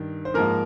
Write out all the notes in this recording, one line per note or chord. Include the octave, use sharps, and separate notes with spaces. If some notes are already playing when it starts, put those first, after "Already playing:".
Already playing: G2 D#3
C5
G#2 F3 A#3 A#4